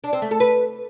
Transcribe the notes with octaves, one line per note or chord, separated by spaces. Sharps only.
D4
C4
A3
A4
B4